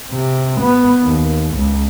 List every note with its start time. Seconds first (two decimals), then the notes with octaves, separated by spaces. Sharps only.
0.11 C3
0.61 B3
1.03 D#2
1.55 C#2